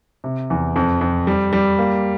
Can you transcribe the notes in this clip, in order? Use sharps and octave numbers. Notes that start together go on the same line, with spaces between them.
C3
E2
F2
F2
G3
G3
A#3